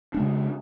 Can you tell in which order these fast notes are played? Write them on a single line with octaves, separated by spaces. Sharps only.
D4 G#3 C#3